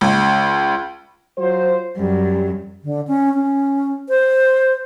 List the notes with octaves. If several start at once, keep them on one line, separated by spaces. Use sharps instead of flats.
C#2
F#3 F4 C5
F#2 G3
D3
C#4
C#4
C5